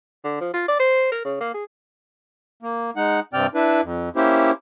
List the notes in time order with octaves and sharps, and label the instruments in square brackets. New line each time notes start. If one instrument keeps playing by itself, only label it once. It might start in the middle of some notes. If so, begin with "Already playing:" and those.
[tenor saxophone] D3
F3
F4
D5
C5
A#4
C#3
A#3
G#4
[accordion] A#3
G#3 D#4 F#5
G2 C3 C4 D5 G5 F6
D4 E4 B4
F2
A#3 C#4 E4 G4 C5